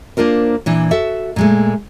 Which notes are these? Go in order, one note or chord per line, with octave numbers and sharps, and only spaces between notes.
A#3 D4 F4 A#4 C5
A#2 E3 D4
F#4 A4 E5
A#2 G#3 A3